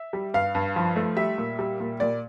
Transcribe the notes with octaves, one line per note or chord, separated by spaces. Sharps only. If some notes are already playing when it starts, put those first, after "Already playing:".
Already playing: E5
G3
G2 F5
G2
F3
A3
G3 E5
A#2
G3
A#2
A#2 D5